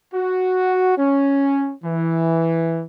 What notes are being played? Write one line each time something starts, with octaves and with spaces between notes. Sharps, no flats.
F#4
C#4
E3